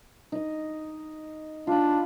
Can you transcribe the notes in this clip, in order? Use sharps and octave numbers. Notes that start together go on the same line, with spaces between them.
D#4 D#5
D4 F4 B5